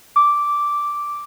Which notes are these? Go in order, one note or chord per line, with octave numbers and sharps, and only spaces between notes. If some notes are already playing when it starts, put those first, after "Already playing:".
D6